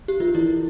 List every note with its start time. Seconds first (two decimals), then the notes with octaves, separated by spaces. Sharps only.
0.08 G4
0.20 F3 F4
0.35 E3 E4